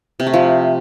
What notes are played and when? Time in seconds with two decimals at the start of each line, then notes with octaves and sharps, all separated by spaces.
0.20 C3
0.27 A3
0.34 F3